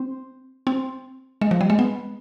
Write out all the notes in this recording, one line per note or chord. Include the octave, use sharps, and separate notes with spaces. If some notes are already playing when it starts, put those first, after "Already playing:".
Already playing: C4
C4
G#3
F3
G3
G#3
B3